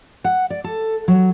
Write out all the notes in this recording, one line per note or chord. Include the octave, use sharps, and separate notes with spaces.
F#5
D5
A4
F#3